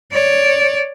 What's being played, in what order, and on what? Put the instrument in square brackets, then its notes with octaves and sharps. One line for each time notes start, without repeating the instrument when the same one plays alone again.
[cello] C#5 D5